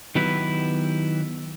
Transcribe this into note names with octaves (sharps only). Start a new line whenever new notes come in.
D#3 F#3 B3 E4 G4 B4